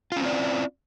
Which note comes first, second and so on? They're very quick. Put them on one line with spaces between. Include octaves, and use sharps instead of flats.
F4 C#4 C4 D5 E4